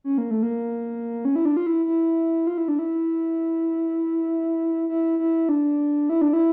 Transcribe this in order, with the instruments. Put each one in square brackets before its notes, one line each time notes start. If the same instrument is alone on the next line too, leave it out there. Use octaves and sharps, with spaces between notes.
[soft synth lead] C#4
A#3
A3
A#3
C#4
E4
D4
F4
E4
E4
F4
E4
D4
E4
E4
E4
D4
E4
D4
E4